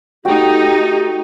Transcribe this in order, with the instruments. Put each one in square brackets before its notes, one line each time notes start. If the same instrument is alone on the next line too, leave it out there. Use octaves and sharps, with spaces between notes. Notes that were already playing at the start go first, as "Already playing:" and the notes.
[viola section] A3 D#4 [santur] F#4 G5 [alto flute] G4